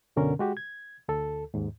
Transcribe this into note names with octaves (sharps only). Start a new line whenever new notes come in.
F#2 B2 D3 C#4 A#4
G#3 F#4 G4
G#6
D2 A4
D#2 G#2